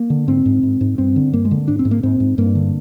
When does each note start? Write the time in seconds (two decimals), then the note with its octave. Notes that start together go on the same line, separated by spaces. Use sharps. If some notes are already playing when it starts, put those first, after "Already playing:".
Already playing: A#3
0.10 D3
0.28 G#2 C4
0.46 G#2
0.63 G#2
0.81 G#2
0.98 G2 C4
1.16 D3
1.33 G2 A#3
1.45 G#3
1.51 D3
1.68 G#2 D4
1.79 C4
1.85 G#2
1.91 A#3
2.03 G#2 C4
2.20 G#2
2.38 G2 A#3
2.55 D3